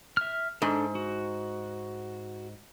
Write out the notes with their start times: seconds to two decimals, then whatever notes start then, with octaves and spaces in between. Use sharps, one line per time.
0.17 E5 F6
0.62 G#2 D4 A4
0.95 F#4